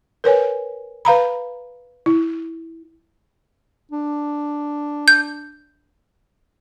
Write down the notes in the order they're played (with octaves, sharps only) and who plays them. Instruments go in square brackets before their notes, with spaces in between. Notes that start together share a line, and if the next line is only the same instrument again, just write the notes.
[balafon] A#4 B4 C#5 G#5
B4 F5 A#5 B5
E4
[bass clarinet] D4
[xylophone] G6